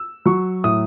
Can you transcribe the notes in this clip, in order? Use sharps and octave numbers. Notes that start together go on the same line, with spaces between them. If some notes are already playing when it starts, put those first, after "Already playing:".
Already playing: E6
F#3 C#6
A2 D#6